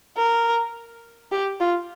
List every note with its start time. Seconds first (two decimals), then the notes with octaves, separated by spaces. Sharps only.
0.17 A#4
1.32 G4
1.60 F4